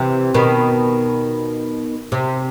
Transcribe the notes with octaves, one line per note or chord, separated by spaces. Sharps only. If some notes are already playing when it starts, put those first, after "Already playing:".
Already playing: C3 E3
B2 D#3
C3